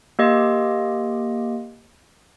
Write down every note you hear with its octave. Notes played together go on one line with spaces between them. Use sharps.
A#3 G4 D#5 C6 D6